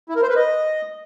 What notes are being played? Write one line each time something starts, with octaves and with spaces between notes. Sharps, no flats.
E4
A#4
C5
B4
D#5